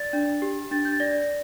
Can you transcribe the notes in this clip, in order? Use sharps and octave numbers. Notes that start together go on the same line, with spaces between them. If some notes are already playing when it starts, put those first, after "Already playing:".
Already playing: D5 A6
D4
G4
D4 A6
G6
A6
D5 A#6